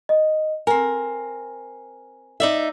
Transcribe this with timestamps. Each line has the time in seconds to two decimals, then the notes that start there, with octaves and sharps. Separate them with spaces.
0.09 D#5
0.67 C4 A#4 G#5
2.40 D#4 D5 E5